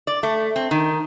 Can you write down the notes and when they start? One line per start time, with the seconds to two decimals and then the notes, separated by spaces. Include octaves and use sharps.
0.07 D5
0.23 A3
0.56 C4
0.71 D#3